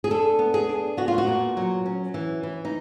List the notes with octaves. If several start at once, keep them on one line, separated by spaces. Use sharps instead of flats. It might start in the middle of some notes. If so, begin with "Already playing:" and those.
G#4
D4 A4
B3
G#4
D4
B3 F#4
F4
F#4
A#2
F#3
C#4
E3
E3
D#4